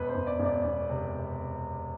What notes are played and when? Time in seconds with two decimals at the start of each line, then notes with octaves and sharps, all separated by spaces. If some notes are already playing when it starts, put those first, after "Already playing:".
Already playing: E1 B4
0.08 C5
0.15 E1
0.27 D5
0.39 E1
0.45 D5
0.65 E1
0.90 C3